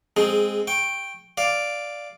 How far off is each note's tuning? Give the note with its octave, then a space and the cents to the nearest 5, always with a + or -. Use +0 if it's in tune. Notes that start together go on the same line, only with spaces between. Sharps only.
G#3 -10 C4 +0 G#4 +10
G5 +0 C#6 -20
D5 +0 F5 +0